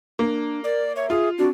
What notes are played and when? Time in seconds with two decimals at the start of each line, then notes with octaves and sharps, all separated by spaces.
0.19 A#3 D4
0.64 A#4 D5
0.96 C#5 E5
1.10 F4 G#4
1.38 C4 D4 F#4